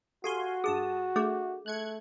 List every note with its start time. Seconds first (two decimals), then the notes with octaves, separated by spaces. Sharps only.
0.24 F#4 G4 A4 F5 G#5 C6
0.64 G2 G#4 A5 D#6
1.16 A3 D4 G#4 D6
1.66 A3 F#6 G#6 C#7